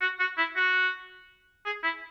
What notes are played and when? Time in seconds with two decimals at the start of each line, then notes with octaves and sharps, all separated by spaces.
0.01 F#4
0.20 F#4
0.38 E4
0.56 F#4
1.65 G#4
1.83 E4